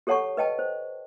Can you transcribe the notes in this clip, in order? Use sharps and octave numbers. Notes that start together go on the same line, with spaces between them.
G4 A4 C#5 F#5 A5 C#6
B4 D#5 G5 A5
C5